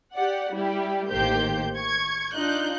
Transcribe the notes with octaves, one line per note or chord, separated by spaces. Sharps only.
G4 D5 F#5
G3 E4 G4
A1 D#3 A#3 G4 C5 G6
C#6 G#6
D4 D#4 F4 F#6 G6